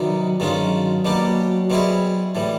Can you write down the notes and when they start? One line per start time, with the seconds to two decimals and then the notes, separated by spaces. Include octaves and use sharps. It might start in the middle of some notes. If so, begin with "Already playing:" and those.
Already playing: C3 D#3 F#3 G3 B3 D#4
0.40 G2 D#3 F#3 G#3 C#4 F4
1.05 B2 G3 A#3 D4 G4
1.70 B2 G3 C4 E4 G#4
2.35 A2 E3 G3